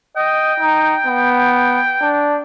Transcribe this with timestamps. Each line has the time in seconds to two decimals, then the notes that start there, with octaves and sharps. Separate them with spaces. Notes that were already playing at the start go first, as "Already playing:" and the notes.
0.17 D#5 G5
0.60 D#4
1.06 B3
2.02 D4